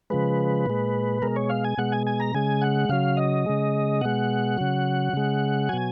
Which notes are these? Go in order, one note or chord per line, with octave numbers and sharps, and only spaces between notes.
C#3 F3 G#3 B4
A#2 G#3
B2 G#3 A#4
C#5
F5
G#5
B2 G#3 F#5
G#5
G#5
A#5
C#3 G#3 G#5
F#5
C#3 F#3 F5
D#5
C#3 G#3
B2 G#3 F#5
C#3 F#3
C#3 G#3
B2 F#3 G#5